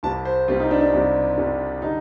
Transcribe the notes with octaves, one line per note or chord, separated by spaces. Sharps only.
C2 C3 G3 A5
C5
C2 C3 G3 F4
D#4
D4
D4
C2 C3 G3
C2 C3 G3
D3 G3 D#4